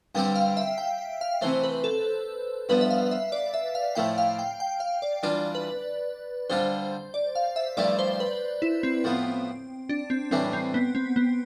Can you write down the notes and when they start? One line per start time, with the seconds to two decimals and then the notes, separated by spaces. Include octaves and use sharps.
0.15 G2 D3 G3 C4 G4 G5
0.35 F5
0.57 E5
0.78 G5
1.21 F5
1.41 C3 E3 A3 C5
1.63 B4
1.84 A4
2.69 G2 F3 B3 B4
2.81 E5
2.91 F5
3.11 E5
3.32 D5
3.54 E5
3.75 F5
3.95 A2 F3 A3 E4 G5
4.18 F5
4.39 G5
4.60 G5
4.80 F5
5.02 D5
5.23 E3 G3 D4 F4 D5
5.55 B4
6.50 D3 G3 D4 F4 C5
7.14 D5
7.35 F5
7.56 E5
7.77 G2 F3 A3 E4 G4 D5
7.99 C5
8.20 B4
8.62 E4
8.83 C4
9.04 A2 F3 B3
9.89 D4
10.10 C4
10.31 A2 E3 G3 C4 D4
10.53 C4
10.74 B3
10.95 C4
11.16 B3